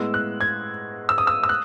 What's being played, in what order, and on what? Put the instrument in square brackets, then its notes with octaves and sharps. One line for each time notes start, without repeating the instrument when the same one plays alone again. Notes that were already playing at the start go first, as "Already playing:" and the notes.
Already playing: [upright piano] A2 G#3 B3 E6
F#6
G#6
E6
D#6
E6
E6
F#6